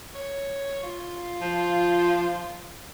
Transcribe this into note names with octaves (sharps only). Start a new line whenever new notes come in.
C#5
F4
F3